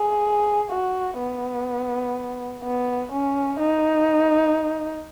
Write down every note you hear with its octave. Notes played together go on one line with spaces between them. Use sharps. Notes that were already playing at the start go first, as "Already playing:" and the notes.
Already playing: G#4
F#4
B3
B3
C#4
D#4